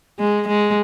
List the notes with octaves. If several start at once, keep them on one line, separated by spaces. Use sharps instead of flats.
G#3
G#3